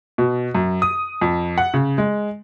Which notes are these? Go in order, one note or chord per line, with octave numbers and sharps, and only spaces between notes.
B2
F#2
D#6
F2
F#5
C#3
G#3